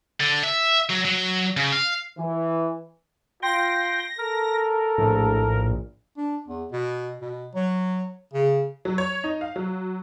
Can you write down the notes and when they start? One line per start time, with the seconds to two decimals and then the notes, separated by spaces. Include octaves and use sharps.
0.20 D3
0.43 E5
0.89 F#3
1.05 F#3
1.57 C#3
1.72 F5
2.16 E3
3.42 F4 G5 C6 A#6
4.19 A4 A#4
4.98 A#1 A2
6.17 D4
6.48 E2
6.72 B2
7.21 B2
7.55 F#3
8.34 C#3
8.85 F#3
8.98 C#5
9.24 D#4
9.41 F5
9.56 F#3